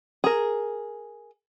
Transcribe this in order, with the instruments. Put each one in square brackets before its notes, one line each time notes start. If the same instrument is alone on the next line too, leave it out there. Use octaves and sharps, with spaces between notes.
[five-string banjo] G#4 A#4